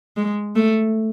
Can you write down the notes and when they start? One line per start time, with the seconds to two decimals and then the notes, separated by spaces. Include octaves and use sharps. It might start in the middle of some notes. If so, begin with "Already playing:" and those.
0.17 G#3
0.56 A3